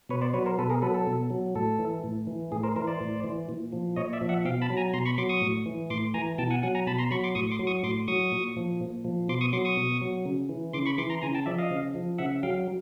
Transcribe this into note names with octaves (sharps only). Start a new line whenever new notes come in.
B2 B4 C#5
C5 D5
F#3 B4 C#5
A#4 C5
B2 A4 B4
G#4 A#4
F#3 A4 B4
A4
B2
F#3
A2 A4
E3
A2
E3
A2 G#4
A#4 C5
E3 A#4 C5
C5 D5
A2
E3
A#2
F3
A#2 C#5 D#5
D5 E5
F3
E5 F#5
B2 F5 G5
A5 B5
F#3
G#5 A#5
B2 A#5 C6
B5 C#6
F#3 C6 D6
C#6 D#6
A2
E3
A2 C6 D6
E3 G#5 A#5
B2 G5 A5
F#5 G#5
F#3 F#5 G#5
G#5 A#5
B2 A5 B5
A#5 C6
F#3 B5 C#6
C6 D6
A2 C#6 D#6
C6 D6
F#3
C#6 D#6
A2 C6 D6
F#3 C#6 D#6
A#2
F3
A#2
F3
B2 C6 D6
C#6 D#6
F#3 C6 D6
C#6 D#6
B2
F#3
C#3
E3
C#3 C6 D6
B5 C#6
E3 C6 D6
A#5 C6
C#3 G#5 A#5
G5 A5
F3 D5 E5
D#5 F5
C#3
F3
C#3 E5 F#5
F#3 F5 G5